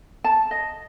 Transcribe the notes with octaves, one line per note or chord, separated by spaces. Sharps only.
A5
D#5